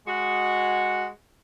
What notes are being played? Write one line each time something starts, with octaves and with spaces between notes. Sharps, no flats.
G#3 F#4